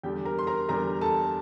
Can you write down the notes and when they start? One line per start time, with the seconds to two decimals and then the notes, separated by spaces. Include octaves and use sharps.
0.03 E2 D3 G3 G4 G5
0.25 A#4 A#5
0.38 C6
0.47 A#4 A#5
0.69 E2 D3 G3 A#4 A#5
1.01 A4 A5